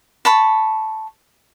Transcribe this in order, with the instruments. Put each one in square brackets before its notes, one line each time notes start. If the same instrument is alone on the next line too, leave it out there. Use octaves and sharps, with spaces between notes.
[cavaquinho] A5 B5 C#6